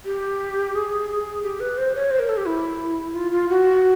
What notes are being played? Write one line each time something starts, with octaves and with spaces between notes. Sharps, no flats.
G4
G#4
G4
B4
C5
C#5
C5
A#4
A4
G4
E4
F4
F4
F#4